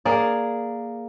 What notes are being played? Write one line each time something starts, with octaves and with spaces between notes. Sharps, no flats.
A#3 G#4 D5